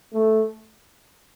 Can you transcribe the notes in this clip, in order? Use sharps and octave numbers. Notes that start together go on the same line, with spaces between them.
A3